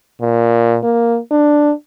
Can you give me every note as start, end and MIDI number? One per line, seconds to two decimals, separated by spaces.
0.21 0.78 46
0.83 1.18 58
1.31 1.73 62